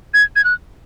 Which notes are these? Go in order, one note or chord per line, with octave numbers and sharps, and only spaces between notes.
G#6
G#6
F#6